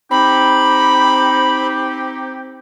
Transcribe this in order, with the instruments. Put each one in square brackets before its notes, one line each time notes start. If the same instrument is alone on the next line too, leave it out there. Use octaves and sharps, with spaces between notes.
[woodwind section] C4 D#4 G4 [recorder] B5